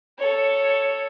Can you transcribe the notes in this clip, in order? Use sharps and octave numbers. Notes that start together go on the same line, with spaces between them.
A4 C#5